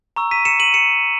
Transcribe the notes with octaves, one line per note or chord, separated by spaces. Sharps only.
A#5 C#6 E6
B6 D#7
C#7 E7
D#7 F#7
C#7 E7